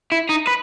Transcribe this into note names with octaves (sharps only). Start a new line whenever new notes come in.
E4
D#4
B4